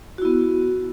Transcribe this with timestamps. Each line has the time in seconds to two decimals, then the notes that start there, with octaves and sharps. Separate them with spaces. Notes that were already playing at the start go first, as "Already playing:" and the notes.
0.18 F#4
0.22 E4
0.25 B3